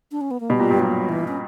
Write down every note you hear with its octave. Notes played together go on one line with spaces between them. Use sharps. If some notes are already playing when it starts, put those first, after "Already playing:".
D4
C#4
B3
A#3
B2 G3
A#2
G2
A#2 F#3
E3
C#4